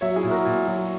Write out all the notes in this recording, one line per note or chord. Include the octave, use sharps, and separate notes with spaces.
F#3 C#5 E5
E4 G#4
A#2
F#4 A#4
A#2
F#3